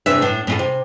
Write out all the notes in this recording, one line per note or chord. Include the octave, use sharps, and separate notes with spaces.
E2 C3 E3 D4 E5
A2 D4
A2 C#4 D4 F4 A4
C3